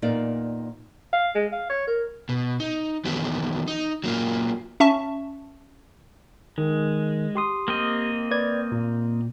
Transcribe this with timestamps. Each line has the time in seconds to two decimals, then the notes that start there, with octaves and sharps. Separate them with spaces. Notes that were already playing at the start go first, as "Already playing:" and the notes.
0.02 E2 A#2 A#3 D#4 D5
1.13 F5
1.35 G#3
1.52 F5
1.69 C#5
1.87 A#4
2.29 B2
2.60 D#4
3.05 D#3 E3 F#3 B3 G4 A4
3.68 D#4
4.04 F#3 A#3 F4
4.80 C#4 E5 A5 C#6
6.58 D#3 G#3
7.35 G4 C6 D#6
7.68 A#3 C4 D#5
8.31 B4 D5 G#6
8.72 A#2